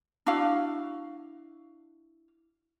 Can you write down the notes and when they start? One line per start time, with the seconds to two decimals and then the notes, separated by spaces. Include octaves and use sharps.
0.26 D4 E4 F#4 F5